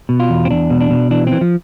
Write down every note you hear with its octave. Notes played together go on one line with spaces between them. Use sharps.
B2
F4
E2
C4
E2 D4
B2
D4
B2
E3 D4
E3 C4
F3